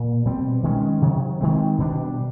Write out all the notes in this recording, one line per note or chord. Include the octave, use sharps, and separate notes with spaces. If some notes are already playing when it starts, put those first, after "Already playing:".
Already playing: A#2 A#3
B2 G3 C4
D#3 G#3 C#4
C3 D#3 F#3
D#3 G#3 C4
B2 G3 B3 D4